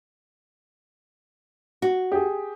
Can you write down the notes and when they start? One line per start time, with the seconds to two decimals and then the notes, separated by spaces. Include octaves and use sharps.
1.82 F#4
2.12 G4 G#4